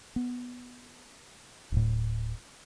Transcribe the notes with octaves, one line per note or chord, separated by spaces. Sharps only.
B3
D1 A2